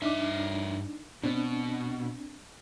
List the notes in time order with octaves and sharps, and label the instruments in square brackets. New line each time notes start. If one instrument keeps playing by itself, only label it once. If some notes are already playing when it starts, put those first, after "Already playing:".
[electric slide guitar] G2 E5 [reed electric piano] D4 D#4 D6
[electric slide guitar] B2 [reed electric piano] C4 D4